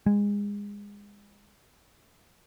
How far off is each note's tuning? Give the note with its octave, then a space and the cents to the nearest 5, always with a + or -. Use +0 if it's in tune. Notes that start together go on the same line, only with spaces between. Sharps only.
G#3 -25